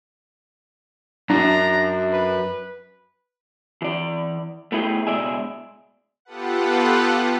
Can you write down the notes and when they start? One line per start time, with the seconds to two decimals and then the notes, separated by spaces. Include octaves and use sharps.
1.30 F#2 D4 A#5
2.13 B4
3.82 E3 D5
4.72 A3 B3 E4 G#4 G5
5.07 C#2 B2 G#3 D5 E5 G#5
6.25 B3 F4 G4 A4 B4 F#5